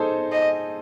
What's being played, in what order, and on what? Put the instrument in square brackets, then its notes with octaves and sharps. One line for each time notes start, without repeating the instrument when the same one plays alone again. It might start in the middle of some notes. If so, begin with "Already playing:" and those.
Already playing: [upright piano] D#4 G#4 A4 C5
[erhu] D#5